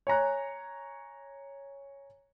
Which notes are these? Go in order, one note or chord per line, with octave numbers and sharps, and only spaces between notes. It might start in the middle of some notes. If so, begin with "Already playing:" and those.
C#5 G#5 A#5 F#6